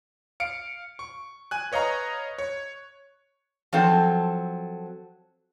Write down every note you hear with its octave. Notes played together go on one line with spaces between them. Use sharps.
F5 C#7 D7
C#6
G#5 F#6
B4 C#5 D#5 F5 A#5 C#6
C#5
F3 F#3 C4 A4